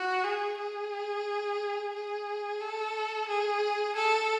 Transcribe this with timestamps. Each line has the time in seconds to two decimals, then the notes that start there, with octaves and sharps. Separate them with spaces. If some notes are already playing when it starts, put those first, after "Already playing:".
Already playing: F#4
0.24 G#4
0.58 G#4
1.94 G#4
2.61 A4
3.28 G#4
3.96 A4